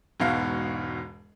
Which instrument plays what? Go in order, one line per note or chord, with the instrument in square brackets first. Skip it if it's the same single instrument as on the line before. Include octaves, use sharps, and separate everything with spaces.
[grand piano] E1 G#2 B2 F#4 F5